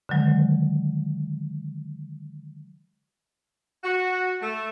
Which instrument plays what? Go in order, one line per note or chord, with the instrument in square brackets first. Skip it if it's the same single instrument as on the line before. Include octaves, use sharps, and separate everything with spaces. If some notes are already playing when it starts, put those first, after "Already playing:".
[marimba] D3 D#3 F#3 G#3
[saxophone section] F#4
A3